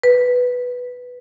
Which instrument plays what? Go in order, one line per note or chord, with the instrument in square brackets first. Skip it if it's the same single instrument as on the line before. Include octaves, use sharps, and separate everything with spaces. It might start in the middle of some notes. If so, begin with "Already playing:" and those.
[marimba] B4